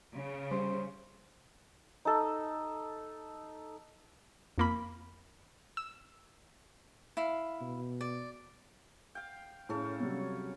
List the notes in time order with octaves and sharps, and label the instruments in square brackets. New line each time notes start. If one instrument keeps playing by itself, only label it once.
[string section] C#3
[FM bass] G3 [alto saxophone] C5
[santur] D#4 A4
[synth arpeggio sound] F2 A#3 B5
E6
[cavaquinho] E4 F5
[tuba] B2
[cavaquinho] D5
[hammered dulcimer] F5 G5
[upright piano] A2 [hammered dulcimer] C#3 C#4 A4
[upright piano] C3 F#3 G3